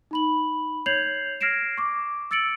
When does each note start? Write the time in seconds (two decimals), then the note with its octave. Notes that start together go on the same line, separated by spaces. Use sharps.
0.11 D#4 B5 F#7
0.86 C#5 G6 G#6 C7 F7 F#7
1.41 F6 G#6 A#6 C7 D7 E7
1.78 C#6 D6
2.31 E6 A6 C#7 D7 F#7